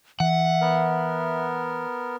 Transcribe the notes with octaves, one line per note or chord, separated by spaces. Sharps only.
E3 E5 F#5
B3 A#4